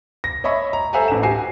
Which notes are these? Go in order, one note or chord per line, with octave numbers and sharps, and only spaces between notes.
A#6
C#5 D#5 E5 B5 C#6
A#5
A4 C5 E5 F#5 G#5 A#5
A1 E7
F#4 G4 G#5 C7